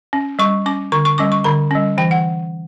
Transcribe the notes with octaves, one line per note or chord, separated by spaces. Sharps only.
C#4
G3 C#6
C#4 D6
D3 C#6
C#6
G3 C#4 D6
C#6
D3 B5
G3 C#4
E3 G5
F#5